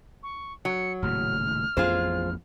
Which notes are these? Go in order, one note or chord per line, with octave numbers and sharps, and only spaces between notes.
C#6
F#3 C#7
D#1 A2 C#3 F6
A1 F2 B3 F4 G#4 C5